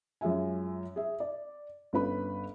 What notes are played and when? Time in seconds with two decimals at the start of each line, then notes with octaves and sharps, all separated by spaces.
0.21 F#2 G#3 F4 E5 G#5
0.96 G#4 E5
1.20 D5
1.93 G1 C#4 B4 B5